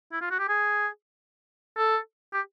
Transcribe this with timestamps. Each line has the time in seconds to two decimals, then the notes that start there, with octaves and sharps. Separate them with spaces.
0.12 E4
0.21 F4
0.31 F#4
0.39 G4
0.49 G#4
1.77 A4
2.33 G4